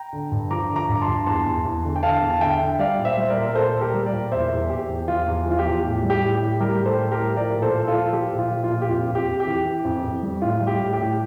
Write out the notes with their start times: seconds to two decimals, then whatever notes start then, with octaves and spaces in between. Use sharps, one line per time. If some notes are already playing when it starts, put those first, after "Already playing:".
Already playing: G5 A#5
0.13 D3
0.32 G2
0.51 F3 A#5 D6
0.70 D3
0.76 A#5 D6
0.89 G2
1.01 A5 C6
1.08 G2
1.26 E2 A5 C6
1.46 E2
1.65 E2
1.84 D3
1.96 G5
2.03 D3 F5 A5
2.22 E2
2.30 A5
2.41 D3 E5 G5
2.60 D3
2.79 G3 D5 F5
2.99 A#2
3.05 C5 E5
3.17 G3 C5
3.30 A#4 D5
3.37 A#2
3.46 A#4
3.55 A#2 A4 C5
3.69 C5
3.75 A#2
3.81 G4 A#4
3.94 G3
4.06 A#4 D5
4.13 A#2
4.32 E2 C5 E5
4.51 E2
4.70 E2 G4
4.89 E2
5.08 F3 F4
5.27 E2
5.46 F3 F4
5.59 G4
5.65 E2
5.84 A2
6.03 G3
6.10 G4
6.23 A2
6.35 G4
6.42 A2
6.60 G3 G4 A#4
6.79 A2
6.85 A4 C5
6.99 A2
7.11 G4 A#4
7.18 A2
7.37 F3 A#4 D5
7.56 A#2
7.62 A4 C5
7.75 A#2
7.87 F4 A4
7.94 F3
8.13 F3 G4
8.32 A#2
8.39 F4
8.51 F3
8.64 F4
8.70 A#2
8.82 G4
8.89 F2 F4
9.08 F2
9.15 G4
9.27 F2
9.40 G4
9.46 E3
9.65 E3
9.85 F2
10.04 F2
10.23 G3
10.41 A2 F4
10.61 G3
10.67 G4
10.80 A2
10.93 G4
10.99 A2